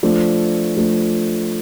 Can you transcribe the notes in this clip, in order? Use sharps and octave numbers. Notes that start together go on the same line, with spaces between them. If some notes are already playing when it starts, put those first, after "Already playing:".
F3 A3 D4
F3 A3 D4